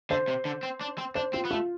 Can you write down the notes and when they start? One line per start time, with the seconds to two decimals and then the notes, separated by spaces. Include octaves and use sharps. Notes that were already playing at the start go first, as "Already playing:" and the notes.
0.10 D3 C5
0.28 C3
0.45 D3
0.63 C4
0.81 D4
0.98 C4
1.15 D4 C5
1.33 C4 F4
1.45 B3
1.51 A3 F4